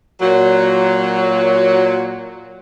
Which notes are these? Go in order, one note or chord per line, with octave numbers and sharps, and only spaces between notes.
A#2 F#3